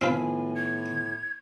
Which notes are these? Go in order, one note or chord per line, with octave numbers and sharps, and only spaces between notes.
A2 D#3 F3 B3 C4 F4 B4 G#5
G#6